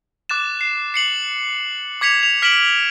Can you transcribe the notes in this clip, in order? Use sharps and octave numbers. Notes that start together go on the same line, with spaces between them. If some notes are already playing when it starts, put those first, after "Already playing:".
D6 F#6 A6 E7
C7
C7 C#7 F#7
D6 G#6 B6 C#7 F7
F7
F6 B6 C#7 D7 E7 F#7